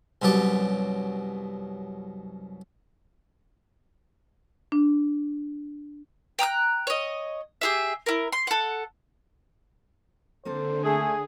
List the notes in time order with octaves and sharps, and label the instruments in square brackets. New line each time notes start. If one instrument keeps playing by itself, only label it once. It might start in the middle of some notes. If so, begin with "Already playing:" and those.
[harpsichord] C2 F#2 B2 G4 A5
[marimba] D4
[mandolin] G5 A#5 D#6 F#6
C#5 D#5
G4 G#4 E5
E4 A#4
C6
A4 F#5
[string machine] D3 [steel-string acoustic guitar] A#3 C4 A4 [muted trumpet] C5
[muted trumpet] A3 [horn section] G#4